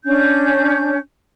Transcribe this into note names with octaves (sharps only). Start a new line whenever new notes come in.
C#4 D4 G6